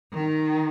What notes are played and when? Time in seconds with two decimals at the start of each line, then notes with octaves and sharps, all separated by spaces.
0.13 D#3